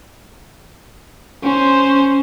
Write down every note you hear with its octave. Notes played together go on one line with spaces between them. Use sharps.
C#4 C5